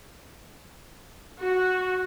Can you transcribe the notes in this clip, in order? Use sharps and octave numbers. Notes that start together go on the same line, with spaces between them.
F#4